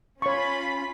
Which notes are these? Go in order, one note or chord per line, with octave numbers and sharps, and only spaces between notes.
C#4 F4 C#5 B5 C#6